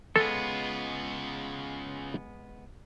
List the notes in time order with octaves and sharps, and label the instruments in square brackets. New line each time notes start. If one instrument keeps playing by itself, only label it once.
[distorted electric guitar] C#3 F4 [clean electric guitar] G#3 B3 [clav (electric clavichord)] A4